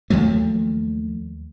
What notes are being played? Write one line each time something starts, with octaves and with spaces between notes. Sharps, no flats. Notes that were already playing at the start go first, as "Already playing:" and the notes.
D#2 F3 F#3 A3